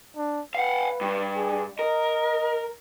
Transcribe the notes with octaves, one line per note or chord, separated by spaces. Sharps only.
D4
B4 F5 F#5
G2
G#4
A#4 D#5